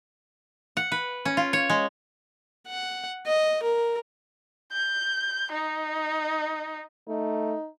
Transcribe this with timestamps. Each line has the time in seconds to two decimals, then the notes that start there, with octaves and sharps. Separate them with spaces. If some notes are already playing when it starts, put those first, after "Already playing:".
0.77 F#5
0.92 B4
1.25 C#4
1.37 F4
1.53 C#5
1.70 G#3
2.67 F#5
3.26 D#5
3.63 A#4
4.72 G6
5.52 D#4
7.08 A3 D#4